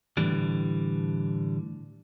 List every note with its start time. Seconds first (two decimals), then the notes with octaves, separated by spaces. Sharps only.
0.17 A2 D3 E3 G3